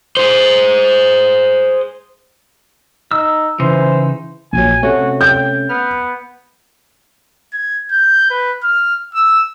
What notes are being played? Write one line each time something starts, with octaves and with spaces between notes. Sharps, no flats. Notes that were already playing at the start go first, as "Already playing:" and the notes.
G#4 C5
D#4 E6
C#3 E3 D#4 C5
A#1 F#3 G#5
C3 A3 C#4 F#4
G5 G6
B3 F6
G#6
G6
B4
F6
E6